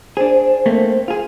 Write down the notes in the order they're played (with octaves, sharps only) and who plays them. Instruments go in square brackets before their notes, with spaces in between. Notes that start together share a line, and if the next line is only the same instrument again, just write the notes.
[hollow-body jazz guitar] D4 G#4 [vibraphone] C5
[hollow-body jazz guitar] A3 A#3 C4
F4 G#4